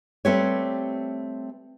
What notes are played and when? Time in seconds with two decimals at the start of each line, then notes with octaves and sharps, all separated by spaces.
0.25 G3 A3 C4 G4 B4 C#5